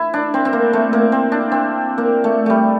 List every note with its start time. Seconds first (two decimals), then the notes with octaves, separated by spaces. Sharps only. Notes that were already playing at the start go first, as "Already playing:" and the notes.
Already playing: E4
0.14 D4
0.34 C4
0.45 C4
0.53 A#3
0.73 A3
0.93 A#3
1.12 C4
1.32 D4
1.52 C4
1.98 A#3
2.24 A3
2.46 G3 A3